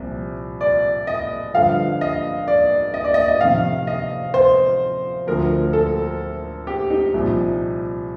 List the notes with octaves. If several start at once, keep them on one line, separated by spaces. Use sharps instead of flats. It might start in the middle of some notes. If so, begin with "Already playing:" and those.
Already playing: C2 A#2 F3
D5
D#5
G2 D3 F3 F5
D#5
D5
D#5
D5
D#5
D#5
F2 C3 D#3 F5
D#5
C5
D2 D3 F3 A#4
A4
G4
D#4
C2 A#2 F3